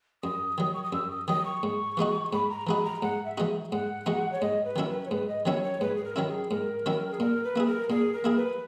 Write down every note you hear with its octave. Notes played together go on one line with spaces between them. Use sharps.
F#2 D#6
D#3 F#3
C#6
D#6
F#2 E6
D#6
D#3 F#3 D#6
C#6
G#2
E3 G#3 D#4 F#4
G#2 B5
A#5
E3 G#3 D#4 F#4 B5
A#5
G#2 F#5
E5
E3 G#3 D#4 F#4
G#2 F#5
E3 G#3 D#4 F#4
C#5
G#2 D#5
B4
D#3 F#3 C#4 E4 A#4
B4
C#5
G#2 B4
D#5
D#3 F#3 C#4 E4 C#5
C#5
G#2 B4
G#4
A#4
D#3 F#3 C#4 E4
G#4
G#2 A#4
D#3 F#3 C#4 E4
G#4
A#2 A#4
B4
A#3 E4 G#4
A#4
A#2 G#4
A#4
A#3 E4 G#4
B4